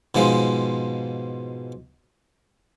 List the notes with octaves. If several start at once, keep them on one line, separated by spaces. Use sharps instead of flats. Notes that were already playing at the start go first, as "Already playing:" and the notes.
G#2 B2 F3 G#3